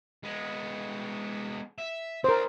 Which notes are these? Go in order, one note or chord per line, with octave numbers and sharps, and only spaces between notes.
G#3 B3
E5
C4 A#4 C5 D5